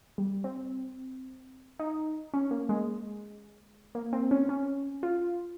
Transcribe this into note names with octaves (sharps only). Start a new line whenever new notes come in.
G3
C4
D#4
C#4
A#3
G#3
A#3
C4
C#4
C#4
F4